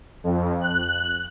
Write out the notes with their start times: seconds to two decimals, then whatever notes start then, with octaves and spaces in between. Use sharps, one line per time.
0.24 F2
0.61 F#6